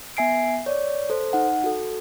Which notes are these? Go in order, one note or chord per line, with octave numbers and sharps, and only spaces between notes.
B3 E5 G#5 C7 D7
C#5 D5
A4 C5
D#4 F#5
F#4 A4